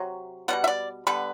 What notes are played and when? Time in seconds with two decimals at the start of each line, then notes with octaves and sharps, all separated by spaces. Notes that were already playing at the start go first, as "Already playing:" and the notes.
Already playing: C3 F#3
0.48 B2 G3 B3 F#5
0.64 E5
0.68 D5
1.07 D3 G3 B3 B4